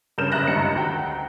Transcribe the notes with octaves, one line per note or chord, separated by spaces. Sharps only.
G2 C#3 A#4 G6 E7
F#1 C#3 E5 F#6 A#6
C#2 G2 D#3 C#7
D2 G5 A#5